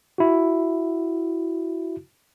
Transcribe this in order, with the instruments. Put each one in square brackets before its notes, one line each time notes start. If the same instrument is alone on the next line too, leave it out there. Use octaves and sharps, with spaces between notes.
[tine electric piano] E4 F#4